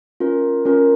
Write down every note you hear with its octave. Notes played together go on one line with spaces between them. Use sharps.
C#4 F4 A#4
C#4 F4 A#4